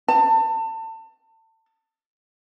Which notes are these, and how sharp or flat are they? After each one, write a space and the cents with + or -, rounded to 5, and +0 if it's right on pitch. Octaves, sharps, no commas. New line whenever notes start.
A5 +30